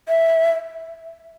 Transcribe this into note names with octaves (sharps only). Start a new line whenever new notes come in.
E5